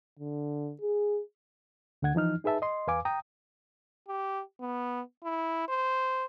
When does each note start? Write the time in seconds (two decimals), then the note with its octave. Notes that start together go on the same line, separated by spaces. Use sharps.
0.19 D3
0.81 G#4
2.02 D2 D3 F#5 G#6
2.15 E3 F3 D#4 F6
2.44 D#4 G#4 B4 E5 A5
2.62 D#5 C6
2.87 E2 B4 F5 G#5 D6
3.05 G5 A#5 D#6
4.08 G4
4.61 B3
5.24 E4
5.69 C5